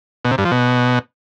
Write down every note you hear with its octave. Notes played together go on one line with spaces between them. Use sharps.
B2
C3
G2
F3
B2